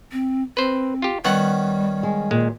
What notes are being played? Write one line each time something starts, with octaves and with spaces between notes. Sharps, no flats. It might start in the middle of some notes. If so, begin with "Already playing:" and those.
C4
C4 B4 C5
F4 G4
D#3 G3 B3 C#4 F#5
G#3
A#2 G#3